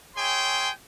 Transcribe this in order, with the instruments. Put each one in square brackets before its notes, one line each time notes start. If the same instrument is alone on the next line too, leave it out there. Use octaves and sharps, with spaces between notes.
[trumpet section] G#4 C#5 E5 G5 G#5 C6